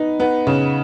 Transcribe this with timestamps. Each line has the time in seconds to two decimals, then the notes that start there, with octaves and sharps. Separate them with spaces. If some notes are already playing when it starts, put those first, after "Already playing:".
Already playing: B3 D#4
0.20 B3
0.47 C#3